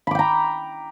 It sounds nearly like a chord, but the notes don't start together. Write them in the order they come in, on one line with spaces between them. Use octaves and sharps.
B5 D6 G5 A#5